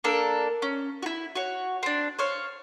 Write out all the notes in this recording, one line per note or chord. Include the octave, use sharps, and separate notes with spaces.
A#3 D4 A4 A#4
C#4
E4 F#4
F#4 C#5
C4 D4
C5 C#5 F5